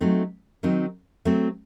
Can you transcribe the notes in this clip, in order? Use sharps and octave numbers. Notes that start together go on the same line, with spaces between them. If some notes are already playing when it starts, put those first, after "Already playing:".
F#3 A3 C4 D#4
D#3 F#3 C4 D#4
F#3 A3 C4